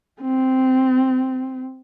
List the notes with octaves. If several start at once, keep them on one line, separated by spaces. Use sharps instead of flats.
C4